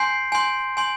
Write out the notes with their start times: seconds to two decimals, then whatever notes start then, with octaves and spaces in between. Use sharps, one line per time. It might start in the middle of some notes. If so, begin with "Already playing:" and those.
Already playing: G#5 C6 G6 C7
0.32 G#5 C6 G6
0.77 G#5 C6 G6